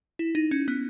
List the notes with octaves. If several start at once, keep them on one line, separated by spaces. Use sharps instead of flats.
E4
D#4
C#4
B3